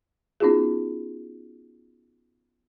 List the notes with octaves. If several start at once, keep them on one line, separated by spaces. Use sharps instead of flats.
B3 C#4 D#4 F4 F#4 G#4